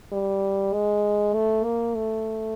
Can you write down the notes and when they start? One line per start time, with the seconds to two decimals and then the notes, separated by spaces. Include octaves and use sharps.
0.12 G3
0.73 G#3
1.34 A3
1.64 A#3
1.95 A3